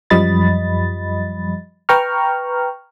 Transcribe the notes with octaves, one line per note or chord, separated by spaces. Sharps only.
F#2 F3 G3 D#5 B5 A6
B4 G5 A#5 C#6 F6